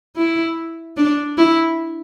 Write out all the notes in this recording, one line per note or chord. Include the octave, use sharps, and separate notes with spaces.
E4
D4
E4